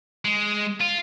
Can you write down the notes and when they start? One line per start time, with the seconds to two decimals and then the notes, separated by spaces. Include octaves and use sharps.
0.25 G#3
0.80 F4